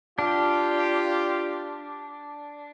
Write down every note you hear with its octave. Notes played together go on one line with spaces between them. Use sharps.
D4 F4 G4